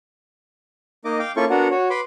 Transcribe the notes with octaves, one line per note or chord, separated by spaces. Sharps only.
A#3 D#4 D#5 D6
F5 G5 D6
A#3 C#4 E4 F4 A4 C#6
B3 D4 F#4 A#4 F#5
F#4 C#5
B4 B5 C6 D6